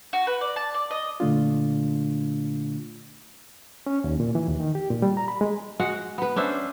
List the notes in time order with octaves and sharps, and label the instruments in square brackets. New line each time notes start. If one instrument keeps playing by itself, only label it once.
[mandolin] F#4
B4
D5
A5
D5
D#5
[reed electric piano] A#2 D3 A3 D4 F4
C#4
D#2
A#2
E3
D#2
D#3
G4
A#2
G3
A#5
B5
G#3
[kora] G#3 F#4 F#5
B3 B4
C#4 D4 C5 E5